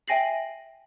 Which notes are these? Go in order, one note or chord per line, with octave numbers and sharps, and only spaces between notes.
E5 G5 G#5 A#6 C7 F#7